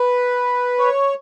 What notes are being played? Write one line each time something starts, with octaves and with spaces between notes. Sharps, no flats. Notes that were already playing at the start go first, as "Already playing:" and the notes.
Already playing: B4
C#5